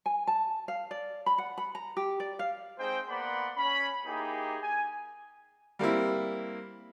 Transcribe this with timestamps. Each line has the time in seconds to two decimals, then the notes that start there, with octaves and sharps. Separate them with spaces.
0.06 G#5
0.27 A5
0.68 F5
0.91 D5
1.26 B5
1.38 F#5
1.58 B5
1.75 A#5
1.97 G4
2.20 D5
2.39 F5
2.78 G#3 C4 D#4 G#4 C5 G5
3.09 A#3 B3 D5 F#5 B5 C6
3.56 C#4 B5
4.06 A#3 D#4 E4 G4 G#4
4.62 G#5
5.79 G3 A#3 C4 E4